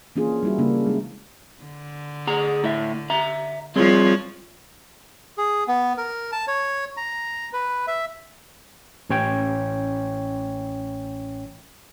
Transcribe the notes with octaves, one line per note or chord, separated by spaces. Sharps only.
E3 A#3 C#4 D4 F4 G#4
G3 E4 F#4
C#3 A#3 D4
G#3 E4
D3
G#4 F#5 A#5
A2 E5
E5 A#5
F3 G3 C4 F4 G#4 C#5
G#4
B3
A#4
A5
C#5
A#5
B4
E5
A1 C#4 C#5 G5